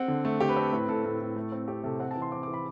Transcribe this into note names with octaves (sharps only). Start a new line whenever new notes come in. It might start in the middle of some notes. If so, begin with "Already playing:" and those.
Already playing: C4 F#5
D3
A3
D3 G4
B4
C4 A4
A2 B4
A2 A4
A2 A4
A2
A3
C4
C4 G4
C3 A4
C4 F#5
A5
E3
C6
C4 D6
D6
E3
B5